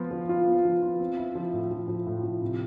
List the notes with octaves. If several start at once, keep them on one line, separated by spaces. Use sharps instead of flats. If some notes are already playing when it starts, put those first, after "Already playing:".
Already playing: F3 B3 F4
F3
F4
B3
F3
F4
C4
E4
F3
A2
F3
F3
A2
F3
C3